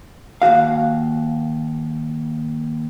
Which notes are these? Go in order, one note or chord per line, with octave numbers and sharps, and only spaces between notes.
D#2 D#3 F#4 F5